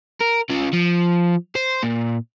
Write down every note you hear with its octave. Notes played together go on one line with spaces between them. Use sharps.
A#4
C#3 F4
F3
C5
A#2